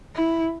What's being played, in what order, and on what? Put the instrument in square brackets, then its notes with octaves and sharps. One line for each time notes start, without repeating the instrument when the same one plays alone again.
[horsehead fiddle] E4